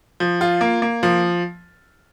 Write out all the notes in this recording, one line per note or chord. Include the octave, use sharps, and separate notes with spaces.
F3
F4
A#3
A#3
F3